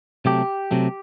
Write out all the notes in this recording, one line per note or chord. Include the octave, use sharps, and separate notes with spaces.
C3 F#3 A3 G4
C3 F#3 A3